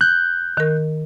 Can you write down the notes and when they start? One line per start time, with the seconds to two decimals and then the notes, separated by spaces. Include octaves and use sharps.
0.01 F#6 G6
0.57 D#3 A#4